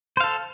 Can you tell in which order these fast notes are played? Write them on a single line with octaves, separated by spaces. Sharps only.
C5 F5 A4